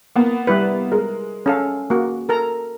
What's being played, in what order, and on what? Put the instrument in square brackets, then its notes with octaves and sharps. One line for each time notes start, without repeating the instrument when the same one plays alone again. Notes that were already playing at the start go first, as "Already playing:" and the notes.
[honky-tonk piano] A#3 B3
[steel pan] G3 E4 B4
[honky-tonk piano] G#3 [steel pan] A#4
[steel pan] C#4 A4 F5
A#3 F#4
A4 A#4 A#5